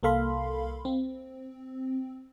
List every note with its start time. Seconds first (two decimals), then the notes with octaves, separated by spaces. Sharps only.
0.03 C2 A#3 A4 F5 B5 C6
0.85 C4